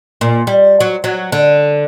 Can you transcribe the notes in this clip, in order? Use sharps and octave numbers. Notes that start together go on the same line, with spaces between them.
A#2
G3
F#3
F#3
D3